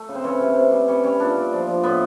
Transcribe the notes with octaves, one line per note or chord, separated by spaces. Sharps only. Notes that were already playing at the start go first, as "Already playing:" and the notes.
Already playing: A3
C#3
C4
E3 C#4
C3
C3
G3
G3 C#4
G3 C#4
A#2 D4
A#2
F3
F3
A2 B3